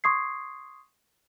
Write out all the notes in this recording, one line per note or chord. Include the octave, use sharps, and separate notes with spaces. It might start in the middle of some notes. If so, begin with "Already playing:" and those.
C6 C#6 D#6 G#6 C7